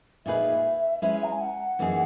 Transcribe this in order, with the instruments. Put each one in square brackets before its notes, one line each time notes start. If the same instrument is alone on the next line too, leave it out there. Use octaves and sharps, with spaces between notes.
[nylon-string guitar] A#2 A#3 D#4 G#4 B4 [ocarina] E5
[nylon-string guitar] G#3 C#4 E4 B4
[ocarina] A#5
G#5
F#5
[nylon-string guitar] F#2 E3 A#3 D#4 G#4